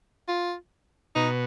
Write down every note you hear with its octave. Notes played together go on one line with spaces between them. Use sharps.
F4
B2 D#4